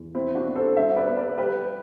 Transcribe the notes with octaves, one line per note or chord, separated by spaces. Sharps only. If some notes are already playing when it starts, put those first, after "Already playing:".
Already playing: E2
G3 C4 E4
D4 F#4
B3
A4 C5
G2 C5 E5
B4 D5
B3
B4 D5
G3 G4 B4